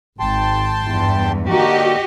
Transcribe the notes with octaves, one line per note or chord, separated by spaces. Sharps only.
G#1 G5 A5 C6
E2 G2
D3 A#3 D#4 F#4 G4 D#5